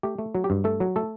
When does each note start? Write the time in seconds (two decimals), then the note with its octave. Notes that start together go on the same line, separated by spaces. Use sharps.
0.03 A3 G4
0.19 A3
0.35 F#3
0.44 G4
0.50 G2
0.64 A3 A4
0.80 F#3
0.96 A3 A4